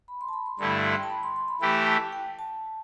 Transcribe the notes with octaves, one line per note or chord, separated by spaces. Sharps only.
B5
C6
A5
B5
C6
G2 D3 A3 E4 B5
C6
G5
A5
B5
C6
C6
B5
E3 A3 E4 G4 B5
A5
G5
A5